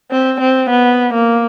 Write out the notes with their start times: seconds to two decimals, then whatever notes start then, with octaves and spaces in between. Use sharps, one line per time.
0.12 C4
0.41 C4
0.70 B3
1.14 A#3